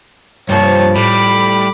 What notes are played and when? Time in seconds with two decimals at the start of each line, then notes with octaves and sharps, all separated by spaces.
0.49 G2 C3 F3 A#3 C#5 A5
0.96 A2 G3 B5 D6